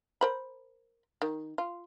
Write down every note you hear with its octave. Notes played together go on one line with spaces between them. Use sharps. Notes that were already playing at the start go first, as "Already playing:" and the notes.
A#4 C5 B5
D#3
F4